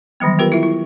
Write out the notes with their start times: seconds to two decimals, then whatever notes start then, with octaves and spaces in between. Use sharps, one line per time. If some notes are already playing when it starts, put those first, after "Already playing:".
0.20 D#3 E3 F#3 G3 B3
0.39 B3 F4 G4 A#4 B4
0.52 E4 F4 E5
0.63 E4